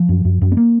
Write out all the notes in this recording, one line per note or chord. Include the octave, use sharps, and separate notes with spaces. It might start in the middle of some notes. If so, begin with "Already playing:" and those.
Already playing: F3
F#2
F#2
F#2
B3
A#3